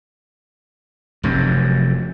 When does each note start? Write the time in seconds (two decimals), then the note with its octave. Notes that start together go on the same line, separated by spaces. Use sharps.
1.23 F1 F#2